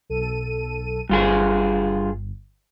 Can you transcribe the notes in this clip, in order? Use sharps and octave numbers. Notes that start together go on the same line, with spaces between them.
B1 A4 D#7
G1 G2 F4 G#4